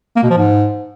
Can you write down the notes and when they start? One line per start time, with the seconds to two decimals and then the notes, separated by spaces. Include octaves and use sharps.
0.16 A#3
0.23 B2
0.30 F3
0.37 G#2